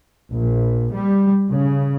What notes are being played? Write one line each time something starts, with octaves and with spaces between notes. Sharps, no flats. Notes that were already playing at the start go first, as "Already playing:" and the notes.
A#1
G3
C#3